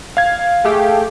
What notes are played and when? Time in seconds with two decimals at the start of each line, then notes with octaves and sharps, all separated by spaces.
0.17 F5 G#6
0.65 A3 G4 G#4